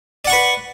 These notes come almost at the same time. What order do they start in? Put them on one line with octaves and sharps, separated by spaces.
D5 F#5 C#6 B4